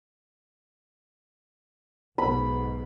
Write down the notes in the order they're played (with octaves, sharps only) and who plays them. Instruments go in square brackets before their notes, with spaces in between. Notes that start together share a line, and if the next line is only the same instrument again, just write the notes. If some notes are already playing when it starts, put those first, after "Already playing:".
[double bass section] B1 G#2 B2 [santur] B5